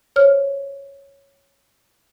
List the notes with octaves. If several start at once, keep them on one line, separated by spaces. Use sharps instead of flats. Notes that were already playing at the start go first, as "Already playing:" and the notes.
C5 C#5 F6